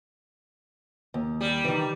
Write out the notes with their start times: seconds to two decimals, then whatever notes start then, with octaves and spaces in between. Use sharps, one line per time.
1.14 D#2
1.41 G3
1.64 D#3 E3